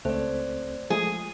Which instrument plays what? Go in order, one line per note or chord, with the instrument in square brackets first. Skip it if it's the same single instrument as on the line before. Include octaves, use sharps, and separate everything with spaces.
[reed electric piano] C#2 A3 C4 [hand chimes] C5 D5
[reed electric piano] F3 G#3 A3 [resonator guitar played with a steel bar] G#4